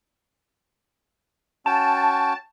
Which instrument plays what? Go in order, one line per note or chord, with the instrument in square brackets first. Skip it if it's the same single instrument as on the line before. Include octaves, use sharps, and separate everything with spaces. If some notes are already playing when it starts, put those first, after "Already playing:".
[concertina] C#4 F#4 G5 [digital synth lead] A5